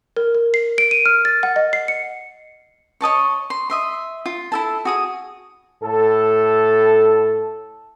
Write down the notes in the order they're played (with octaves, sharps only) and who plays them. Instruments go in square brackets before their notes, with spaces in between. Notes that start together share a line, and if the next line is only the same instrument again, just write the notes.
[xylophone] A#4
A#4
C7
D7
D#7
F6
A6
F#5
D#5
C7
C#7
[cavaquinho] C#5 D#5 A5 C#6
C6
D#5 E5 C6
F4
E4 A4 A5
F#4 G#4 D#6
[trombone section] A2 A4